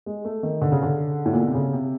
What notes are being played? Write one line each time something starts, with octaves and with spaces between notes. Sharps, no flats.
G#3
A3
D#3
D3
C#3
D3
A2
A#2
B2
C3
C#3
C3